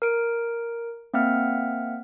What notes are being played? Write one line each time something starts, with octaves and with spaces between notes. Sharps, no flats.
A#4 D7
A#3 C4 E5 F#5 F6